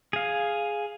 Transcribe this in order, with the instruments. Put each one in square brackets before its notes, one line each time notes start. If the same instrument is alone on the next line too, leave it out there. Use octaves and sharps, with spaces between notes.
[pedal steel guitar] G#4 F5